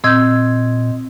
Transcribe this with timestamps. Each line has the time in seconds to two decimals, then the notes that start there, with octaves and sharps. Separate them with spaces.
0.04 A#2 C4 D#5 C6 E6 G6 G#6